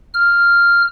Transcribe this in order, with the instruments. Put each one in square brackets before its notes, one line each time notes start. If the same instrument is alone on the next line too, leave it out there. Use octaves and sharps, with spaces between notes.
[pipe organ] F6